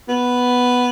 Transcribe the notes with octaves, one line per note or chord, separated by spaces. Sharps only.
B3